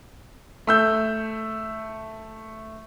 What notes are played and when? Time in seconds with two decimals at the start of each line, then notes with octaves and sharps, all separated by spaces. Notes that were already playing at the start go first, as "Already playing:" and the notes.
0.67 A3 E6 G6